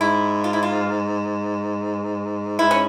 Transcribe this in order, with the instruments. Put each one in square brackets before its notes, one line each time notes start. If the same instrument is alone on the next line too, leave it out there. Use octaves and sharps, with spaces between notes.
[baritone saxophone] G#2 [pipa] E4
[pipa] F4
E4
F4
[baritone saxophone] G#2 [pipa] E4
[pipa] C#4